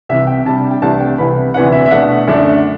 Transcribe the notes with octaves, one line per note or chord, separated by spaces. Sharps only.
C2 C3 E3 E5
G5
C3 G3 D4 A5
G5
C2 C3 E3 A3 D4 A5
G5
C2 C3 E3 B3 B5
D2 C3 E3 B3 D4 F#5
E5
E5
B2 A3 D4 F#5
F#2 D3 A3 D4